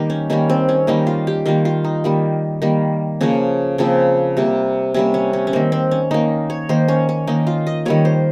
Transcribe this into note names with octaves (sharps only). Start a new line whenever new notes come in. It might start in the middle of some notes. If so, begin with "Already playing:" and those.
Already playing: D#3 G3 A#3 D#4 G4
C#4
D#3 G3 A#3 C#4
C4
C#4
D#3 G3 A#3 D#4
F4
G4
D#3 G3 A#3 F4
F4
D#4
D#3 G3 A#3
D#3 G3 A#3
C#3 F3 A#3 C#4
C#3 F3 A#3 C4
C3 G3 A#3
C3 G3 A#3 C#4
C#4
C#4
C#4
D#3 A#3 C4
C4
C#4
D#3 A#3 D#4
C#5
D#3 A#3 C5
C#4
C#4
D#3 A#3 D#4
F4
D#5
D#3 G3 A#3 C#5
C5